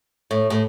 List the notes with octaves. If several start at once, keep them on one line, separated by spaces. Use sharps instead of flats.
A2
A2